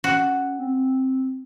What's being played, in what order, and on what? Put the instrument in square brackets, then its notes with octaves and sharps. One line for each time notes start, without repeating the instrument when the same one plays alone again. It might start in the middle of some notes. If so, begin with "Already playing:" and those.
[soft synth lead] C#4 [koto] F#4
[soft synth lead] C4